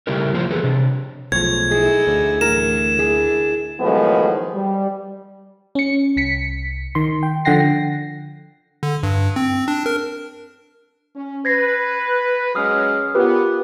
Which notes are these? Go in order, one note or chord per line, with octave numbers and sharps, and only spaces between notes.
C#3 G3 A3 E4 G4 A#4
F3 A#3 F4 G4 C5
E3 G#4 A4 B4
C3 D4
B1 F3 G#3 A3 C#5 G#6
D#4 E4 G#4 A4
D2
A2 E3 F#3 A#4 E7
D4 E4 G#4
A2 D#3 F3 F#3 G#3 B3
G3
C#4 C#7
C2 B6 C#7
D#3 C6
G5
D3 F3 F#5 G5 A#6 C7
D3
G2
C4
D4
A#4
C#4
B4 G#6 A#6 C7
F#3 G#3 C#4 D#6 F6 C7
B3 F4 G4 A#4 B4